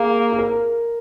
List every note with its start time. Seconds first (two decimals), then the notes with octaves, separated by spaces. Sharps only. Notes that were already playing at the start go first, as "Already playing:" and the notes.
Already playing: A#3 G#4
0.32 G#4
0.39 A#4